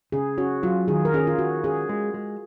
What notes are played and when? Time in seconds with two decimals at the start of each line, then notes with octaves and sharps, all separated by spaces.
0.12 C#3 G#4
0.38 C#4 F#4
0.63 F#3 F4
0.88 D#3 G#4
1.05 A#4
1.14 C#4 G#4
1.27 F4
1.39 D#3 F#4
1.63 C#4 G#4
1.89 G#3
2.14 G#3